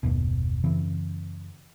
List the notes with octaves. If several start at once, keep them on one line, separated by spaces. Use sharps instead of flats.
F#1 D#2 B2
F#2 C#3 E3 C4